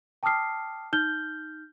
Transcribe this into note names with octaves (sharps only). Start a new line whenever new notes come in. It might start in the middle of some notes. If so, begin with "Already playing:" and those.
G5 A5 D6 D#6 F6 C7
D#4 F6 G6 G7